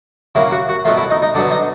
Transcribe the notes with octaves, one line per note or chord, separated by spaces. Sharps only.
C#3 F#3 A#3 E4
F#4
F#4
B2 F#3 A3 F4
E4
D#4
D#4
D3 F#3 B3 D4
D#4